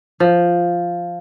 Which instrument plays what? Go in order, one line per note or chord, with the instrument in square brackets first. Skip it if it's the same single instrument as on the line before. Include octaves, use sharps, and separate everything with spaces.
[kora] F3